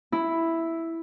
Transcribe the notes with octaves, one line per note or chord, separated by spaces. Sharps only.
E4